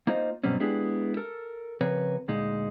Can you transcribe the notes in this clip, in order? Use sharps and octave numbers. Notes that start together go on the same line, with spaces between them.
A#3 D#4 F4 C5 D#5
G2 B2 F#3 G3 C4 C#4
G#3 B3 D4 E4 G4 G#4
A4 A#4
C#3 F3 C4 A#4 B4 C#5
D2 A#2 G#3 D#4